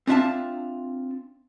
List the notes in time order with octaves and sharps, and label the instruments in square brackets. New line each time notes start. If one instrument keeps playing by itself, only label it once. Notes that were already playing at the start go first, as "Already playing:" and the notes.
[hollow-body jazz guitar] C4 D4 F4 E5 F5 A5